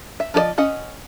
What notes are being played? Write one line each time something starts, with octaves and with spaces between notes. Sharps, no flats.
E5
F3 F4 G#4 D5 D#5
C#4 D#5 F#5